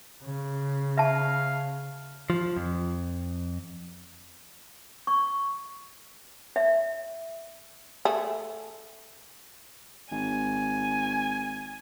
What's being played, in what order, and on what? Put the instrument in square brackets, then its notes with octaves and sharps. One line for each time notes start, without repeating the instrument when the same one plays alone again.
[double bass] C#3
[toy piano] E5 A5 [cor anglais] F5
[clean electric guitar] F3
F2
[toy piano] C#6
E5
[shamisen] A3 G#4
[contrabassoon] G#1 [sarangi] G#5